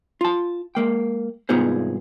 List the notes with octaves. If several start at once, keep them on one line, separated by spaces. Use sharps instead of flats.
F4 A5
G#3 A#3 G5
C2 G#2 B3 F4 G#4 C5